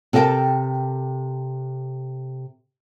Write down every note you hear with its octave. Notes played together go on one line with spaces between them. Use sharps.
C3 A4 A#4 E5 G5 A5